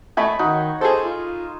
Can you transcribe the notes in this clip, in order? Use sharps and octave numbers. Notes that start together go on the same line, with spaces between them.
A3 D#5 G#5 B5 C#6
D#3 D#4 F#4
G#4 A4 C5
F4